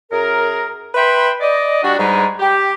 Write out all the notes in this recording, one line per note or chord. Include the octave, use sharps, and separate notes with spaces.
F#2 G#4 A#4
B4 E5 G5 B5 C6
D5 D#5
G3 D4 F#4
G#2 G3 G#3 B4 A#5
G4